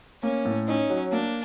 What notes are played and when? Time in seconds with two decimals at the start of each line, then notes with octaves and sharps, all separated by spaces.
0.23 A#3 C#4
0.45 A2
0.68 C#4 D#4
0.90 F#3
1.12 A#3 D4